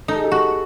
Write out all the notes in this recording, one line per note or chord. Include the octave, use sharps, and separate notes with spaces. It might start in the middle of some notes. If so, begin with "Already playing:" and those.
D#4 A4
G#4
G4 A4
F#4